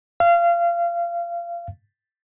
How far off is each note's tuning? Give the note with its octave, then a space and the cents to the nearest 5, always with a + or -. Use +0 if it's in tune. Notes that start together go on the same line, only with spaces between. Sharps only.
F5 -25